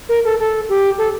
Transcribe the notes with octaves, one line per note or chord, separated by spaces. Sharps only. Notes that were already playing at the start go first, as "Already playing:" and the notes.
A#4
A4
A4
G4
A4